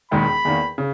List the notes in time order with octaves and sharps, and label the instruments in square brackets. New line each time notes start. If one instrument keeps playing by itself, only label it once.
[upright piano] E1 D#2 D#3 G#3 [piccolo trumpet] B5
[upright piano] E2 D#3 A#3
C#3